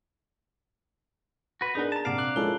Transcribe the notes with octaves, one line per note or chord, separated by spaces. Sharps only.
F#4 B4
B3 D4 D#4 G#4 A#4
A5 A#5 E7
A#1 C3 D5 F5 F#5 C7 D7 E7
D6 F#6 F#7
F3 G#3 C#4 E4 A4 A#4 G7